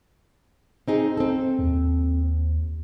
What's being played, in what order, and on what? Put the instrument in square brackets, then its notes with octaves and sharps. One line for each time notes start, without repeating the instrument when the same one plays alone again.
[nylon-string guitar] C4 D#4 G#4
C4 A4
[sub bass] D#2